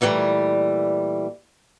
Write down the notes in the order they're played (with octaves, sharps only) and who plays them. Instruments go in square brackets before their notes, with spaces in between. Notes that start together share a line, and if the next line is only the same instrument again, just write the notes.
[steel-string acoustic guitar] A#2 E3 F#3 G3 A3